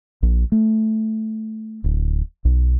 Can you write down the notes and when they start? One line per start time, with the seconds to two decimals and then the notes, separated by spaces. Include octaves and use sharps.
0.22 A#1
0.52 A3
1.84 D1
2.45 B1